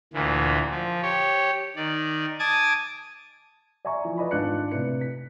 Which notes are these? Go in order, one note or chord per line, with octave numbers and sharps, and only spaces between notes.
D2 A#2 E3
F3
G4 C#5
D#3 D5
G#5 A5 D6 D#6 G#6 A6
D5 E5 G#5 A#5 C#6
E3 F3
B4 D5 D#5 B5
G#1 D4 F4 F#6 C#7
A2 C3 B4 C#7
B6